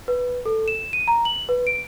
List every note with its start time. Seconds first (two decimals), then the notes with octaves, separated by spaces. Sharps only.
0.08 B4
0.46 A4
0.68 E7
0.93 D#7
1.08 A#5
1.25 F#7
1.49 B4
1.67 D7